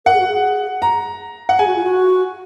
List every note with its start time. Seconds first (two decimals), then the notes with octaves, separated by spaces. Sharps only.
0.06 A#4 F#5
0.14 G#4
0.20 F#4
0.28 G#4
0.82 A#5
1.49 F#5
1.59 G#4 G#5
1.67 F#4
1.76 F4
1.84 F#4